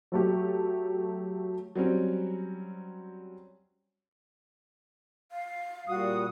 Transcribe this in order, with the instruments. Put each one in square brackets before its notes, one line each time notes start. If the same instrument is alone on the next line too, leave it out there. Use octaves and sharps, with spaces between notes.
[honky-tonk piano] F#3 A3 G4
[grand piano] F#3 G3 C4 C#4
[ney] F5
[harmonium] A#2 G3 [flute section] F#4 D#6